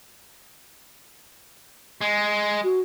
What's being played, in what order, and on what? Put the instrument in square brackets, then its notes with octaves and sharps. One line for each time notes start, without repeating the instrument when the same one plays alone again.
[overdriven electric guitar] G#3
[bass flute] F#4